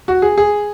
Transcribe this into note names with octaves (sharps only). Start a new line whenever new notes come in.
F#4
G#4
G#4